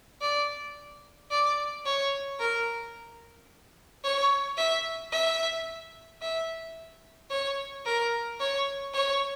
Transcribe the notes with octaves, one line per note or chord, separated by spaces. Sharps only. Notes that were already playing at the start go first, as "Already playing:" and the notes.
D5
D5
C#5
A#4
C#5
E5
E5
E5
C#5
A#4
C#5
C#5